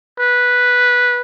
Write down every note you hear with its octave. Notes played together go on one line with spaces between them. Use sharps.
B4